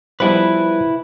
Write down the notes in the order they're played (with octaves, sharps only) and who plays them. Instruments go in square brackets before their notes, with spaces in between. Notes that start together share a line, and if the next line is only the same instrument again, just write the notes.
[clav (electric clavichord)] F3 G3 B3 [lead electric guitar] E4 B4